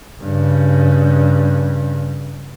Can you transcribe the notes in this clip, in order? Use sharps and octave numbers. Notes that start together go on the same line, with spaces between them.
G2 C#3